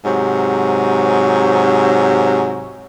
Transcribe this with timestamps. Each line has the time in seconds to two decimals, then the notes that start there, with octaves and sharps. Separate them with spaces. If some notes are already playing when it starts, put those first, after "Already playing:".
0.03 G#2 C3 F#3